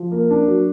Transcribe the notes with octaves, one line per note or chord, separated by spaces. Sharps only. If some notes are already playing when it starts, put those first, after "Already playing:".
Already playing: F3
A#3
D4
F#3